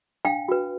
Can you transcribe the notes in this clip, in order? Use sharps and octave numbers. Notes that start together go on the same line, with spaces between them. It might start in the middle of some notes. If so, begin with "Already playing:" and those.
D4 F5 G5
F#4 B4